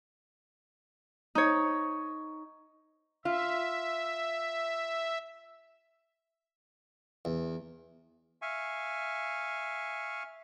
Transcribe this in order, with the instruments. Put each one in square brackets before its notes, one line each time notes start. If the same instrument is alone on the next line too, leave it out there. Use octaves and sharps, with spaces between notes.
[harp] D#4 C#5
[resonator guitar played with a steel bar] F4 [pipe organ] E5
[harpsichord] E2
[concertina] E5 F5 G#5 C#6